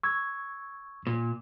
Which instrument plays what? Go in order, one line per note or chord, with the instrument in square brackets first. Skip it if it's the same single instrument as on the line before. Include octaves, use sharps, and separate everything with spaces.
[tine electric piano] C#6 E6 G#6
[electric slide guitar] A#2